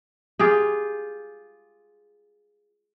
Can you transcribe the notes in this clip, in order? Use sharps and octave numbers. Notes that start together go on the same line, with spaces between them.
F4 G4 G#4